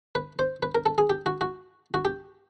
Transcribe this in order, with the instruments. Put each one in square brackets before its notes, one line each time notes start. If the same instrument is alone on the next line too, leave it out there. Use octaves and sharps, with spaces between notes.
[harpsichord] B4
C5
B4
A#4
A4
G#4
G4
F#4
F#4
F#4
G4